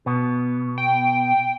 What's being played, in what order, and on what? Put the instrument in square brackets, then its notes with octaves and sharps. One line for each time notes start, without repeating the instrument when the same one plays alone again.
[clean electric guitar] B2 B3
[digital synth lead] G5